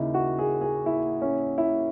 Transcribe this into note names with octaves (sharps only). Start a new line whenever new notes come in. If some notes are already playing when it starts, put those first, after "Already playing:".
Already playing: D#2 C#3 D#4 E4
F#4
G#4
G#4
E4
C#4
E4